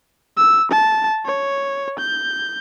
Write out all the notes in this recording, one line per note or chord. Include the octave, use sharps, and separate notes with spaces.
E6
A5
C#5
G6